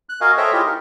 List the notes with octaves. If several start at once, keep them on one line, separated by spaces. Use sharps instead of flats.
F#6
F#4 A#4 D#5 F5 G#5
A4 C5 C#5 D#5 E5 G5
E4 F4 G4 G#4 D#5
D#4 A#4